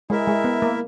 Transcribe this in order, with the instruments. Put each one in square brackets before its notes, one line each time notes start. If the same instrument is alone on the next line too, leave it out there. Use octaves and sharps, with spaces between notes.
[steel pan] G#3 [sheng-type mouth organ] E4 A#4 E5
[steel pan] G#3
B3
A#3